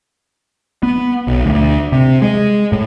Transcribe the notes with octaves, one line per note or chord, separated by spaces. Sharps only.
B3
B1
D2
C3
G#3
A2